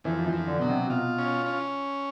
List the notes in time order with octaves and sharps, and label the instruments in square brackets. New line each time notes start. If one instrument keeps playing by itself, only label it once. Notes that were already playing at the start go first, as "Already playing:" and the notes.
[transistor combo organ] F2 [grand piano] E3
[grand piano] F3
E3
[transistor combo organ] F2
[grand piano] D3
[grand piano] B2 [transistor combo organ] F#3
[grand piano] C3
[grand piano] B2 [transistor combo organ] F4
[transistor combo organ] C#4
C#4